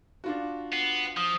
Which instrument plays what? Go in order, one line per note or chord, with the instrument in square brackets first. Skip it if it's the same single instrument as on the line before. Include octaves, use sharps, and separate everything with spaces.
[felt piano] D4 F4 F#4
[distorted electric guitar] B3 [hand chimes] C7
[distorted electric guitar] F3 [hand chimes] D#6